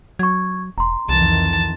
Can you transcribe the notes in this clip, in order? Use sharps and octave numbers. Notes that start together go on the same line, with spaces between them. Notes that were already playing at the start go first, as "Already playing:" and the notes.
F#3 C#6 G#6
E1 A#5 C6
C2 F2 D#3 E3 A5